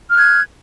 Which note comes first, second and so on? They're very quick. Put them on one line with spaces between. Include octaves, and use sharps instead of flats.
F6 F#6 G#6